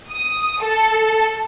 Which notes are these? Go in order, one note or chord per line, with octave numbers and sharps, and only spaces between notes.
D#6
A4